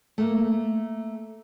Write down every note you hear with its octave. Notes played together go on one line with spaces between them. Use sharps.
A3 A#3